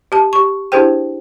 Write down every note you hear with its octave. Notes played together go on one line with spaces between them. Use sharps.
G4 A5
G4 C#6
D4 E4 G4 G#4 C5 G5